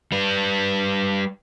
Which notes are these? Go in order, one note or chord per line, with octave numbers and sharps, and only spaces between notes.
G3 B4